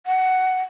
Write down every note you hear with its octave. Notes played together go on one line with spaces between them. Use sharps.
F#5